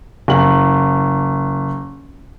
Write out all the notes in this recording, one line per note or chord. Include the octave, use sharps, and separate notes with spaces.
F#1 F#7